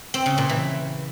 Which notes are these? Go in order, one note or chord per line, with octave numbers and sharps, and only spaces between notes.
C4
C#3
A#2
E3